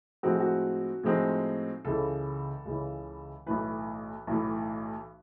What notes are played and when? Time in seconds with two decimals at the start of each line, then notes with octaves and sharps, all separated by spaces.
0.23 A2 F3 G#3 C4 D#4 F#4
0.40 F#4
1.04 A2 F3 G#3 C4 D#4
1.85 C#2 C#3 E3 A4
2.65 C#2 C#3 E3
3.46 B1 A2 E3 B4
4.27 B1 A2 E3